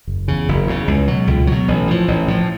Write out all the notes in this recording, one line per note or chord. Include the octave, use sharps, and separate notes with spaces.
F#1
E2 C#3
F#1
E2 C#3
C#2
B2 F#3
C#2
B2 F#3
A1
A2 F3
A1
A2 F3